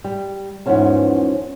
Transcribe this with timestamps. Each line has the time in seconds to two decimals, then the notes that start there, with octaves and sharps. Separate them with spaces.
0.04 G3
0.66 E2 G#2 F3 B3 C#4 A5